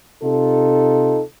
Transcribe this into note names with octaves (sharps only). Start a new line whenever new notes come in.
C3 D#4 F4 A4